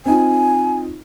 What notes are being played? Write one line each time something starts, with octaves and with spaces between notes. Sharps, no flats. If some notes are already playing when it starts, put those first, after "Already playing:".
C4 D#4 F4 G#5